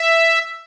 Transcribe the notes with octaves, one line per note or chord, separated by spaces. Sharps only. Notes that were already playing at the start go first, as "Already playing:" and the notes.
Already playing: E5